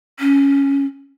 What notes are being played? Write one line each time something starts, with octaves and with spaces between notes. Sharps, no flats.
C#4